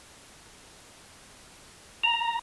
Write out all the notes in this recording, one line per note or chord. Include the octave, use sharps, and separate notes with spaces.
A#5